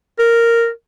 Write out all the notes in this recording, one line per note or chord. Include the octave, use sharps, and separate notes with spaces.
A#4